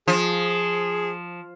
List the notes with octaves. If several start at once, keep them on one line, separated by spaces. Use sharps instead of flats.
F3 G#4